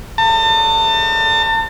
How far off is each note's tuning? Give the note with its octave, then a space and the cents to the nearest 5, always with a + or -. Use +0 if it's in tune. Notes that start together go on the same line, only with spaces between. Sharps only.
A5 +40